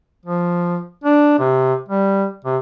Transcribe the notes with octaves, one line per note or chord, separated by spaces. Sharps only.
F3
D4
C3
G3
C3